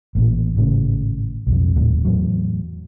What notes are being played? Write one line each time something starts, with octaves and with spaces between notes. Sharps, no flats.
A1 A#2
G#1 A2 C#3
B1 F2
D#1 A2
E2 A2 F#3